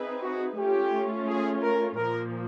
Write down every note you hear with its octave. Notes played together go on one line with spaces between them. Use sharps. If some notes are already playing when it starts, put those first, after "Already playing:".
Already playing: C4 D#4 G#4 B4 E5
F#4
A3 C#4 F4 G4
G#4
A#4
A#2 F3 A#3 A#4